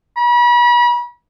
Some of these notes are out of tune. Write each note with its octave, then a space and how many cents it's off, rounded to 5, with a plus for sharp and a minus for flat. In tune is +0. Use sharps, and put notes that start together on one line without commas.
B5 -40